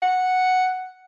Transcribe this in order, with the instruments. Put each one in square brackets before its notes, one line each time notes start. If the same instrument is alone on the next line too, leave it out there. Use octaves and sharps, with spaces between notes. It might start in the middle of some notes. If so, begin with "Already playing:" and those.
[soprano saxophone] F#5